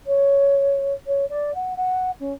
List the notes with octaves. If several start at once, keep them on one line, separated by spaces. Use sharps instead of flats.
C#5
C#5
D5
F#5
F#5
C#4